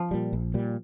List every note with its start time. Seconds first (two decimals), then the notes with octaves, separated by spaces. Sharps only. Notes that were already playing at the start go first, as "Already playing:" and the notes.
Already playing: F3
0.11 A#2 G3
0.33 A#1
0.54 A#2 G3